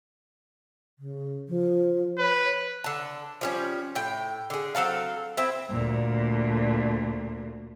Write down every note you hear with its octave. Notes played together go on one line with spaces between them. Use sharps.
C#3
F3
B4 C#5
D3 A5
F3 G3 C#4
A2 G5
D3 G#4
F#3 C4 A4 F5
C4 E4
D2 A#2